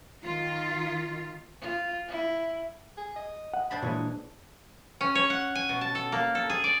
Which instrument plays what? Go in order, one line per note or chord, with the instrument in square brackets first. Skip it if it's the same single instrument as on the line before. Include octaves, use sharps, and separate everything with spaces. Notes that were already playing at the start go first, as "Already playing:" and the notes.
[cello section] D#3 F4
[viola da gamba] F4
E4
[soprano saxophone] G#4
D#5
[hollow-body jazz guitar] F#5
[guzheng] G2 D4 C5 [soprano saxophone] B5
[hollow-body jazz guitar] A#2 E3 G#3 [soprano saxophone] C#5
[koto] C#4
C#5
F#5
G#5
B2
A5
A4
A#3
A4
G#4
D5